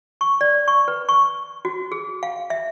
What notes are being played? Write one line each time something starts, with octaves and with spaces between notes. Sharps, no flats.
C#6
D5
C#6
B4
C#6
F#4
G#4
F5
E5